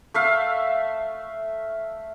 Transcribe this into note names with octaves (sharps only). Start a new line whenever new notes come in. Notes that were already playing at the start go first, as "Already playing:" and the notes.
A3 E5 F5